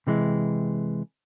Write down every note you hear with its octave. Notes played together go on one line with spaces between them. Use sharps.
C3 E3 G#3